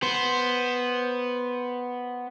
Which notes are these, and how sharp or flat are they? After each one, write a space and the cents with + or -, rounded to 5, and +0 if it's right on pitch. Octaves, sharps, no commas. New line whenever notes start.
B3 +0 C5 +0